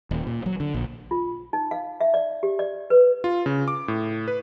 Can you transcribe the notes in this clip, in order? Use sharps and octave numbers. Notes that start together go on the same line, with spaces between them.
D#1
A#2
F#3
D3
A#1
F4
D#4
F5
E5
D5
G4
D5
B4
F4
C#3
D6
A2
B4